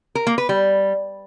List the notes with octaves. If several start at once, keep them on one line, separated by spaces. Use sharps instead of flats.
A#4
A#3
B4
G3